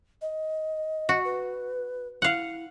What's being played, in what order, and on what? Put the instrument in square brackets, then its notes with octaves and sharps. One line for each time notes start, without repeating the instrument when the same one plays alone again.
[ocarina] D#5
[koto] F#4
[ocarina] B4
[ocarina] E4 [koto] F5 F#5